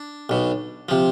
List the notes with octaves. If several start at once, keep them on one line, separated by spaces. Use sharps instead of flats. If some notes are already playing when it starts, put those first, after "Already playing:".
Already playing: D4
B1 B2
C3 F3